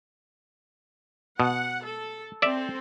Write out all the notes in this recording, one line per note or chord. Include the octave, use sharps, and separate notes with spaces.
B2 F#5
A4
C4 A4 D5 E5